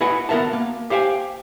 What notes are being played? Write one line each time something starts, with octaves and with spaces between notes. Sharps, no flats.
E4 F#4 B4 D#5 F#5 G#5
B3 F#4 A#4 E5 A5
A#3
G4 C5 F5 G5 G#5